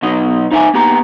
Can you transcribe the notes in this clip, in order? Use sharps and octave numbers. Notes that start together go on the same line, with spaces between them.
B2 F#3 D#4 D#5
D#4 C5 E5 F#5 G#5
A#3 B3 G4 A#5